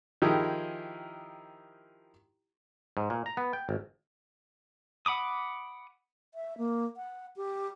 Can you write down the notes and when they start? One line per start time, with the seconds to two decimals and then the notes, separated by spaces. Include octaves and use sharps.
0.22 D#3 F3 D#4 E4 G4 G#4
2.97 G#2
3.10 A#2
3.26 A#5
3.37 B3
3.53 G5
3.69 G#1
5.06 F#5 B5 D6 D#6
6.34 E5
6.58 A#3
6.96 F#5
7.36 G4